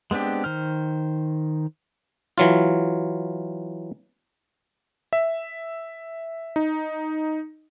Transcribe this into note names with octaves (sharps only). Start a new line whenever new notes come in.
G#3 B3 C4 D4 G4
D#3 C5 F6
E3 F#3 F4
E5
D#4